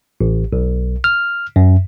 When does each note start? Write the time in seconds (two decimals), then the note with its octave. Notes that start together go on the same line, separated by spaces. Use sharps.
0.21 A1
0.53 B1
1.04 F6
1.56 F#2